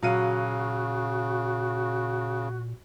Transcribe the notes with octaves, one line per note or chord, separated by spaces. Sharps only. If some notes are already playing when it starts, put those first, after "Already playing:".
A#2 C#3 F#3 F#4 F5 D#7